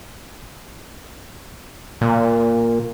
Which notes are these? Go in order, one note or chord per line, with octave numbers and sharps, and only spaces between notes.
A#2